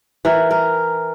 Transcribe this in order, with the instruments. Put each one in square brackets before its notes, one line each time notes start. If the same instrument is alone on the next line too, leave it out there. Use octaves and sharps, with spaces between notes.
[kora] E3 A#4 E5
A#4